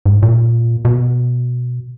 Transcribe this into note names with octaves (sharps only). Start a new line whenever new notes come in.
G#2
A#2
B2